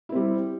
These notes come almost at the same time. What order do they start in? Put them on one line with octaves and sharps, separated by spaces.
E4 C4 G3